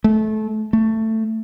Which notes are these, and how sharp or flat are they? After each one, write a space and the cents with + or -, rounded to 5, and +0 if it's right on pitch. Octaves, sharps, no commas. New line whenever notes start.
A3 -25
A3 +15